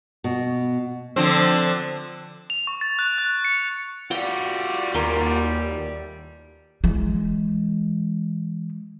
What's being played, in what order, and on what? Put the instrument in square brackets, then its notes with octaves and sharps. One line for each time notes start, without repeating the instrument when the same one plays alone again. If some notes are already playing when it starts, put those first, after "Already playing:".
[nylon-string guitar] B2
[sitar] D3 F3 C4
[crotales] F7
C#6
A6
F#6
F#6
C#7
[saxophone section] A2 E3 G3 [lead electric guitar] F4 F#4 [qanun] G5
[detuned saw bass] D#2 [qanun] A#4 G#5 C6
[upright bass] E3 G#3